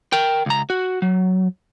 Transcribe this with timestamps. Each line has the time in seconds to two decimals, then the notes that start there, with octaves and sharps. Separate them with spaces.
0.13 A#4 G5
0.46 C#2 A#5
0.70 F#4
1.02 F#3